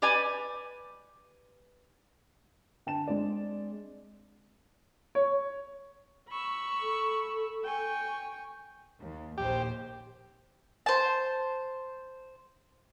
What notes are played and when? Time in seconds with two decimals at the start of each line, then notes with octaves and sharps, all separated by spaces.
0.02 G4 B4 D5 G#5
2.86 D3 G5 A5 E7
3.08 G#3 C4 D4 D5
5.15 C#5
6.29 B5 C#6 E6
6.82 A4
7.64 G5 G#5 C#6
9.01 D#2
9.38 A#1 D#2 G4 C5
10.86 C5 A5